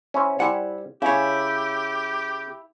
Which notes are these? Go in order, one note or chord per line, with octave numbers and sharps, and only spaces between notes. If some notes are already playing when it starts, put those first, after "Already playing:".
C#4 E4 C5
G3 E4 C5 F#5 G#5
C#3 E4 G4 C#5